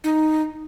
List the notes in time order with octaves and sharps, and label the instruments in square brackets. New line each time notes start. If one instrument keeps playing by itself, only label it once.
[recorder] D#4